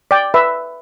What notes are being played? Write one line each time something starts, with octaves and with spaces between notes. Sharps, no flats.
D5 G5
B4 E5